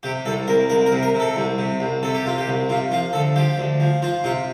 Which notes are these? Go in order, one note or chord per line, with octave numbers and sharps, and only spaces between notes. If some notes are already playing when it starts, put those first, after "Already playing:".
C3 G4
C2 A4
C2 A#4
C2 A#4
A#4
C3
A#4
C3
A4
C2
C3
C2
C3 A4
G4
C3 F4
G4
C2
C3 F4
F3 F4
D2 A4
F3 G4
D2
F3
F3 F4
C3 F4